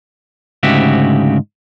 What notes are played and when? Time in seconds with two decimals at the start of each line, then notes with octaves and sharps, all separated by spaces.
0.63 D2 G#2 C#3 F#4 G4 E5